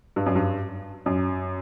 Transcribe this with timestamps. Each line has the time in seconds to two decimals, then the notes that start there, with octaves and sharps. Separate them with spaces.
0.16 G2
0.26 F#2
0.35 G2
1.06 F#2